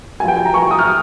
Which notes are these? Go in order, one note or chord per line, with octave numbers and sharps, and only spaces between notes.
G2 F3 G5 G#5
G#5
A#5
C#6
D#6
F6